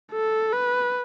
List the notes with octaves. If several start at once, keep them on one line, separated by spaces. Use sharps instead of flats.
A4
B4